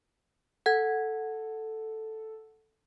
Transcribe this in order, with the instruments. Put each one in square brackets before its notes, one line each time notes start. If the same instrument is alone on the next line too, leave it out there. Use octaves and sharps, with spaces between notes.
[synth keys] A4 [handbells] F#5 G#6